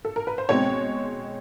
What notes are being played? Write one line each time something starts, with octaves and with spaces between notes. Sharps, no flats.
A4
A#4
B4
C5
B2 G#3 C4 C#5